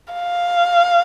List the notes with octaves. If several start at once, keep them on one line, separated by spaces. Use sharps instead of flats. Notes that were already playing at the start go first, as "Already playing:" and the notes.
F5